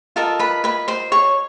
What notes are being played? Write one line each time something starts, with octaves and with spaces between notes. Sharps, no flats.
F4 A4 A#4 D#5 A5
B4 B5
B4 B5
C5 C6
C#5 C#6